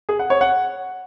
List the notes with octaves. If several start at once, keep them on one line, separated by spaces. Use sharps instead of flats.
G#4
F#5
C#5
F#5